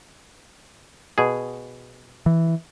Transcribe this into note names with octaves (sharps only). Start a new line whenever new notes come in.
B2 G#4
E3